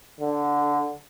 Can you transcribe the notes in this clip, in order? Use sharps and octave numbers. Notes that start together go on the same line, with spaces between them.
D3